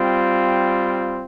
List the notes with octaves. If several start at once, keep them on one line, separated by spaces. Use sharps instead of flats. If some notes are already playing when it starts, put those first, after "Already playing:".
Already playing: G3 C4 F4